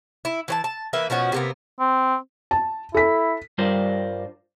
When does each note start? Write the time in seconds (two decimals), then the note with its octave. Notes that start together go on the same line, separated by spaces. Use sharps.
0.25 E4
0.48 E3 C5 A5
0.64 A5
0.93 E3 A#3 B4 E5
1.10 B2 F3 C#4 F#4
1.32 C3 A#3 B3
1.80 C4
2.51 A5
2.94 E4 A4 B6
3.58 G2 G3 F4 A#4 C5 D5